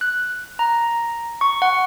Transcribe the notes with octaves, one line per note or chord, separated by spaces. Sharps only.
F#6
A#5
C#6
F#5